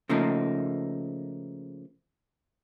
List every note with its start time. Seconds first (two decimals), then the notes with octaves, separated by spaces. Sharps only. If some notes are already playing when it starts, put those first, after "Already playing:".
0.09 C#3 F3 A3 A#3 D#4